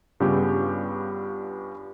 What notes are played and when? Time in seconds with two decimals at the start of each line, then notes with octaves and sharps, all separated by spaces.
0.20 G2 C#3 G3 B3 F4 G4